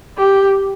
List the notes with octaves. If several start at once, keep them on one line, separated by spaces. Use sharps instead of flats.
G4